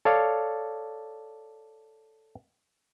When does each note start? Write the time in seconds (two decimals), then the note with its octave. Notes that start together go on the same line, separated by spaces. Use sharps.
0.05 A4 C#5 D5 F5